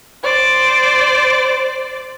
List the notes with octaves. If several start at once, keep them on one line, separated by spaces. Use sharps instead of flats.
C5 D5